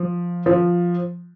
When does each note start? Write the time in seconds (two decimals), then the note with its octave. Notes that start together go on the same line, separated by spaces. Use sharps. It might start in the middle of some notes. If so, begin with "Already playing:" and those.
Already playing: F3
0.46 F3